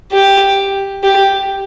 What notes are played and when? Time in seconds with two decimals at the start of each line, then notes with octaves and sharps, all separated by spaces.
0.12 G4
1.03 G4